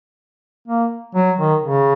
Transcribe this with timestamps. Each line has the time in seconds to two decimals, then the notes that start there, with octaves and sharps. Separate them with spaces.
0.68 A#3
1.15 F#3
1.38 D#3
1.63 C#3